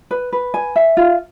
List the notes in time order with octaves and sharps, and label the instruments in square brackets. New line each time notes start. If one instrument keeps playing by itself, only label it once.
[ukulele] B4
B4
G#5
E5
F4